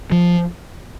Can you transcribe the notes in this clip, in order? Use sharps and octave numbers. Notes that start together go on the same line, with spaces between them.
F3